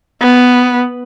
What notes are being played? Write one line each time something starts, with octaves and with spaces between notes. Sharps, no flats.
B3